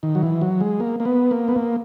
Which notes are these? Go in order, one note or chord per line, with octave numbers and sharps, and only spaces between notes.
D#3
F#3
E3
F#3
G#3
A#3
A#3
B3
A#3
B3
A#3